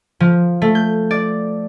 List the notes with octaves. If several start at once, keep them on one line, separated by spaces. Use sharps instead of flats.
F3
A3
G6
D5